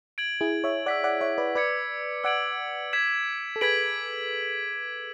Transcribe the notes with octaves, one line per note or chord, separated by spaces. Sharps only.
G#6 D7 F#7
E4 G#4
C#5 E5
D5 F#5 E6 B6 F#7
D5 F#5
C#5 E5
B4 D5
B4 D5 D6 G#6 C#7
D5 F#5 E6 G#6 D7 F#7
G#6 B6 E7
A4
G#4 B4 G#6 B6 D7 F#7